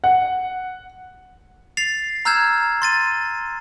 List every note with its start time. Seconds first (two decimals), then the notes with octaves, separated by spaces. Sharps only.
0.04 F#5
1.77 A6 C7 F7
2.25 A#5 E6 F6 G6 G#6 E7
2.82 C6 A6 D#7